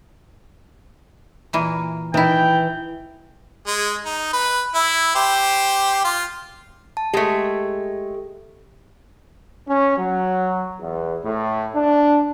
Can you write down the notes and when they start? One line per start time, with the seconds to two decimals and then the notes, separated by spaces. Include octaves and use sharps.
1.53 A#2 E3 A#3
2.14 D#3 E3 E4 G5
3.67 G#3
4.05 D#4
4.33 B4
4.74 E4
5.15 G4 C5
6.04 F4
6.97 A5
7.13 G#3 A3 G4
9.68 C#4
9.98 F#3
10.80 E2
11.24 A2
11.75 D4